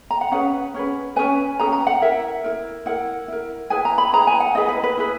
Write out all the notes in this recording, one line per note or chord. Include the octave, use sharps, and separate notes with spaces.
A#5
F#5
C#4 G#4 B4 F#5
C#4 G#4 B4
C#4 G#4 B4 G#5
C#4 G#4 B4 A#5
A#5
F#5
E4 A#4 E5
E4 A#4
E4 A#4 F#5
E4 A#4
E4 G#4 B4 G#5
A#5
B5
E4 G#4 B4 A#5
G#5
F#5
E4 G#4 B4 D#5
B4
B4
E4 G#4 B4